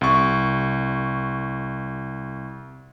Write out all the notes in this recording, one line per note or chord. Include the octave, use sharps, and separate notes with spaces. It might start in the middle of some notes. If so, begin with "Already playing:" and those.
C2 C#6